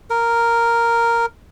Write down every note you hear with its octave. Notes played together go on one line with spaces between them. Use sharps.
A#4